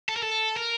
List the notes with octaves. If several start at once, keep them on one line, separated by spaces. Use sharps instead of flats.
A4
A#4
A4
A#4